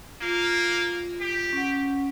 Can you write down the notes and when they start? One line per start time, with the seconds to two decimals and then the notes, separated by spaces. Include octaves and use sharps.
0.21 A#3 F4
1.21 G4
1.53 C#4 F#5